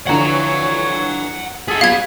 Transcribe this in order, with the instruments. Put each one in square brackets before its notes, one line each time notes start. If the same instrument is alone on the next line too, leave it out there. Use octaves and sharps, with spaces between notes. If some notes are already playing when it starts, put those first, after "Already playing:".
[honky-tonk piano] D3 E3 F3 [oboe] C#5 [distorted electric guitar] F#5 A#5
[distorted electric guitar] G#4 F#5 [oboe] A4 [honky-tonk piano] B6
[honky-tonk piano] B2 F#3 G3 [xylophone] F5 G#6 [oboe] B5